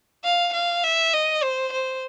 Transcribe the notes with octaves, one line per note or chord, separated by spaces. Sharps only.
F5
F5
E5
D#5
C5
C5